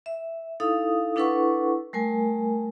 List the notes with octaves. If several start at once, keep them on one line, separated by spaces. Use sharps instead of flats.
E5
D#4 E4 A4 F5 D#6
D4 E4 A4 B4 F#5 C#6
G3 A3 A#4 G#5